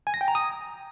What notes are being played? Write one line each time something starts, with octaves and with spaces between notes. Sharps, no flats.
G#5
A#6
G5
A#5
D#6